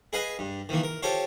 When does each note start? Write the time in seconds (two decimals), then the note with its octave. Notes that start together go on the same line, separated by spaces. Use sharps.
0.13 G#4 B4 D#5 F5 G#5
0.39 G2
0.69 D#3 E3 A#3
0.83 A#4
1.02 F4 G4 A4 C5 C#5 F5